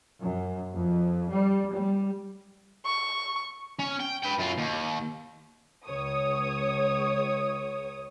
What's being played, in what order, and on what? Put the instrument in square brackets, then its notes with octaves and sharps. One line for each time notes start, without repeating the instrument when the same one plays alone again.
[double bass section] F#2
F2
G3
G3
[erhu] C#6
[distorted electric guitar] C#4
G5
B4 G5
F#2 F4
D#2
[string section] C#2 C#5 D#6